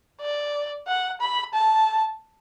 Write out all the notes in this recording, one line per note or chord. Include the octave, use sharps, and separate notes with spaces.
D5
F#5
B5
A5